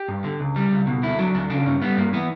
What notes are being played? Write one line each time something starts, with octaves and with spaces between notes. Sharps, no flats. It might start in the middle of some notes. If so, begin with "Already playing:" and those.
Already playing: G4
G2
D3
C#2
G3
C#2
B2
D2 E4
F#3 D4
D2 D4
C#3 D4
G2 C#4
G3 B3
G2 A#3
E3 B3